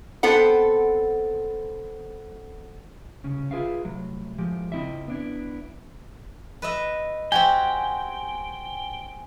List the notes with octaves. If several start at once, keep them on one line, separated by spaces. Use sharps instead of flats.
B3 C4 A4 F#5
C2 C#3 C#4
F4 G#4 B4 E5 F5
C2 A2 F#3
A2 F3 G#3 G4
C#2 C4 E4 D#5 E5
B3 D4 E4
B4 D#5 E5
C4 F#4 G4 G5 G#5